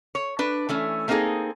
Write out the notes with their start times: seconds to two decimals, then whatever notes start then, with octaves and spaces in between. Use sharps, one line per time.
0.15 C#5
0.39 D4 B4
0.69 E3 A3 C#4
1.08 A3 A#3 C4 D#4 G#4 A4